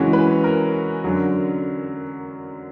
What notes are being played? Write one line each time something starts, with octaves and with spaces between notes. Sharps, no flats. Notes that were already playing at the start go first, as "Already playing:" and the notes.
Already playing: F#2 C#3 E3 G#3 C#4 F#4
B4
A#4
F#2 D3 F#3